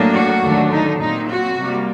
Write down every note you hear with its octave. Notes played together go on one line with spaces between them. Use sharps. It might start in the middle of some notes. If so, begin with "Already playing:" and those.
Already playing: A2 F#3 A#3 D4
F#4
D#2 D3 F#3 A3 D4
D#4
A#2 F#3 C4 D#4
F#4
C3 G3 A#3